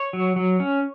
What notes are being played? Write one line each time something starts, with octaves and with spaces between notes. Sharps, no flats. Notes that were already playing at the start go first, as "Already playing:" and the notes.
Already playing: C#5
F#3
F#3
C#4